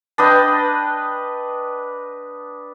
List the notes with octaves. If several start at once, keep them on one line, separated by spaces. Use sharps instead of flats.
D4 B4 D#5 G5